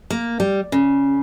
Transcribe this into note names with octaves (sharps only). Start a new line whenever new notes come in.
A#3
G3
C#3